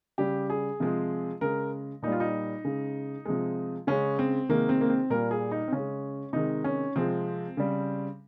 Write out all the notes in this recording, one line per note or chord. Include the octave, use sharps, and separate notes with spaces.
C#3 G3 G4
G#4
C3 F3 G#3
C#3 G#3 A#4
A#2 G3 D#4 F4
D#4
C#3 G#3
C3 F3 G#3
C#3 G#3 C#4
C4
C3 D#3 G#3 A#3
C4
A#3
C4
A#2 G3 A#4
G#4
D#4
C4
C#3 G#3 C#4
C3 D#3 G#3 D#4
C#4
C3 F3 G#3 C4
C#3 G3